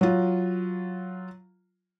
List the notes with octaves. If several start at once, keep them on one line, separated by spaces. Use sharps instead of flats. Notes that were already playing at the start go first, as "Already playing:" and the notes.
F#3 F4